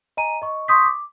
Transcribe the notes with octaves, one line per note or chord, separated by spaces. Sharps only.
D#5 G#5 A#5 D#7
D#5 C#6
C6 C#6 D#6 G6 B6
D6